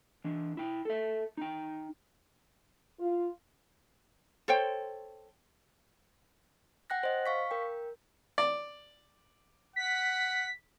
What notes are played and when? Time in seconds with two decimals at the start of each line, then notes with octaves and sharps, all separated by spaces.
0.24 E3 D4
0.57 E4 G5
0.85 A4 E5
1.37 D#4 G5
3.00 F4
4.48 A4 C5 C#5 G5
6.90 F#5 G5 F#6 A#6
7.03 C5 D#5
7.26 F5 C#6 B6
7.51 A#4 G5
8.38 D5
9.76 F#5 B6